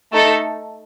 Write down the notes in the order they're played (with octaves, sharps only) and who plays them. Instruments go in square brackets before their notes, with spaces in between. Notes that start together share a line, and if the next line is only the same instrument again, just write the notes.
[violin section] A3 D#4 A4